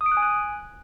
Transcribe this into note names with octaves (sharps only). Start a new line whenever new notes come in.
D#6
D7
F#6
G#5
F#6